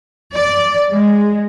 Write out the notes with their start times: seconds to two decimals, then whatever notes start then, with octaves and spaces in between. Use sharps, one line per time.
0.35 D5
0.93 G#3